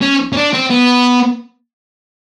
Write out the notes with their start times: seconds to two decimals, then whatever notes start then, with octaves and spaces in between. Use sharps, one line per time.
0.01 C#4
0.33 C#4
0.37 D4
0.53 C4
0.70 B3